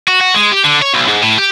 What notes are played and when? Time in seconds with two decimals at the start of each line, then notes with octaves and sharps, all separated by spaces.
0.08 F#4
0.21 F#4
0.34 G#3
0.52 G4
0.64 D3
0.82 C#5
0.93 B1
1.08 G#2
1.23 A2
1.38 G4